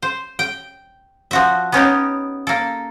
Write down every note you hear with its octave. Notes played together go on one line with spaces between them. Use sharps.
C5
G5
F3 F#4 E5
B3 C#4 D#4 G4
A#3 A4